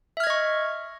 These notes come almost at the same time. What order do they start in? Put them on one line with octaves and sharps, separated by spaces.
E5 F6 G#6 D#5 C#6